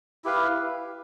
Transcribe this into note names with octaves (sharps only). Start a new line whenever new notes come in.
E4 G4 B4 F5